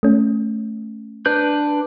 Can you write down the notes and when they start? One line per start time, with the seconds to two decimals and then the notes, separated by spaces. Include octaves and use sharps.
0.03 A3 C#4
1.26 D4 B4 G6